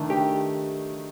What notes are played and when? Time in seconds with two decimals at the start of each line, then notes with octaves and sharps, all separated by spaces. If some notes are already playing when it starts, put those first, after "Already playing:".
Already playing: D#3 A3 D4 A4
0.10 G4